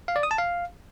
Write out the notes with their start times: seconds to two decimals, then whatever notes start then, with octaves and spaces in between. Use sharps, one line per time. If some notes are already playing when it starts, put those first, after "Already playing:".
0.08 F5
0.16 D5
0.23 D#6
0.31 A5
0.38 F5